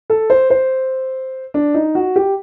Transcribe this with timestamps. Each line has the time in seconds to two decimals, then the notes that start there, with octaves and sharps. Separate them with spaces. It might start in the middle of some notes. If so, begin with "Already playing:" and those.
0.10 A4
0.30 C5
0.50 C5
1.54 D4
1.74 D#4
1.95 F#4
2.16 G4